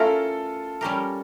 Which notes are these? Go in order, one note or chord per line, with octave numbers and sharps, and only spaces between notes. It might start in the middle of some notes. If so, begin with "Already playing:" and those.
Already playing: A3 C#4 E4 F4 A4 A#4
G3 C#4 G4 A#4